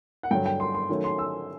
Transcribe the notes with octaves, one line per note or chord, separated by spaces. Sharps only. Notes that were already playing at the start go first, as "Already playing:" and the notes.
F#5
G2 D3 F#3 G5
G5
C6
C6
D#3 F#3 A3 C#4
C6
E6